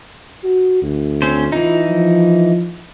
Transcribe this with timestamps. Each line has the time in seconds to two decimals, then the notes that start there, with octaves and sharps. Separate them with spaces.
0.44 F#4
0.82 D2
1.22 C4 C#4 C5
1.52 E3 D#4 F4
1.89 F3